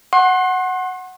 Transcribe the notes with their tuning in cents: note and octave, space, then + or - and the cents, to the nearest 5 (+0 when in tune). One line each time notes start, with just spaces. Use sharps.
F#5 +0 C6 +40